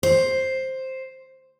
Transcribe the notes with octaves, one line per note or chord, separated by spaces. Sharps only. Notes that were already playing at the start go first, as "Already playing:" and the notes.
C5